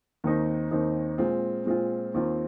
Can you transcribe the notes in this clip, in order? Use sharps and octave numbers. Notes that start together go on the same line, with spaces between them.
D#2 D#3 C4 D#4
D#2 D#3 C4 D#4
A#2 G#3 C4 F4
A#2 G#3 C4 F4
D#2 D#3 C4 F4